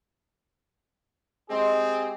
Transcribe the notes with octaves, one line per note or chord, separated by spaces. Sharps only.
G#3 C4 G4 G#4